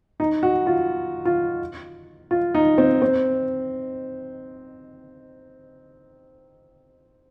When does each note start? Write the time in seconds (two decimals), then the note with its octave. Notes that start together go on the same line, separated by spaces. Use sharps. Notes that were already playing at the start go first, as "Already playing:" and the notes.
0.20 D#4
0.43 F#4
0.67 F4
1.25 F4
2.31 F4
2.55 D#4
2.78 C4
3.02 C4